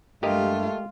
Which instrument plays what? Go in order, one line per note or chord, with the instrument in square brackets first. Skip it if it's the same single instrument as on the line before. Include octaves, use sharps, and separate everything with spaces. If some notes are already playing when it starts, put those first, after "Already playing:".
[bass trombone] G2 [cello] G#3 F4 [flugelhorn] A3 [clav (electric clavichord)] G4 A#4 D#5